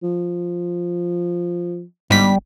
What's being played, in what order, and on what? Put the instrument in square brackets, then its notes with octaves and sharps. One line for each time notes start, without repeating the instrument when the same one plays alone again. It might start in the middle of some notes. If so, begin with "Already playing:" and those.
[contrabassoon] F3
[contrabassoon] G1 [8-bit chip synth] G#2 B6 [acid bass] G3